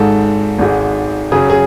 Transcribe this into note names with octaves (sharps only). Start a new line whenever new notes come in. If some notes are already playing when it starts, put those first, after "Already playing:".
Already playing: G#1 G#2 G#3 A4
G#1 G#2 G#3
F#2 C#3 F#3 G#4
G#4